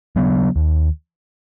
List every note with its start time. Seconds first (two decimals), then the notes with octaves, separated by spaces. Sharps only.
0.16 C#3 F#3 B3
0.56 D#2